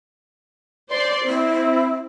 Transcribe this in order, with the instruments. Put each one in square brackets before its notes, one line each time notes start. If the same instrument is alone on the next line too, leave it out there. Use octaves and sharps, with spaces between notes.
[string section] C5 D5 C6
[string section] C4 [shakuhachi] E4